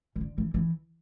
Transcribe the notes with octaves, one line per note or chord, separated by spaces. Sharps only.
E3
D3
E3
E3